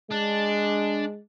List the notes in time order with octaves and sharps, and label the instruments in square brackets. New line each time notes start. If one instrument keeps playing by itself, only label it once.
[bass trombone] G#3 [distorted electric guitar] D4